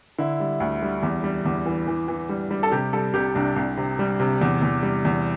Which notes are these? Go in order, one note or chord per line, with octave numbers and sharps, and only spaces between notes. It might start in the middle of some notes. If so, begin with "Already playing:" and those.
D3 E4
G3
D2
G3
E2
G3
E2
E3
E3
E3
G3
G3
A4
C3 G4
G3 A4
C2 G4
C2 D4
C2
C3
G3
C3
E2
E2
G3
E2